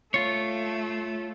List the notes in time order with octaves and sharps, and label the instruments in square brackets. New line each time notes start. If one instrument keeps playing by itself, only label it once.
[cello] A3 [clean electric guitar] F4 C#5